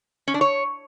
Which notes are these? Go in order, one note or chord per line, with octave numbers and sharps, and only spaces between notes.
C#4
D4
C#5